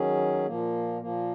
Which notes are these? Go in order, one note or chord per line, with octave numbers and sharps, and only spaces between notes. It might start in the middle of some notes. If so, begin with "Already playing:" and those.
Already playing: D#3 F#3 C#4 G#4
A#2 F3 A#3
A#2 F3 A#3